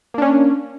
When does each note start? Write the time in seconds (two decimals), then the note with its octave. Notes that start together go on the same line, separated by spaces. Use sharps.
0.14 A#3
0.18 D4
0.22 C#4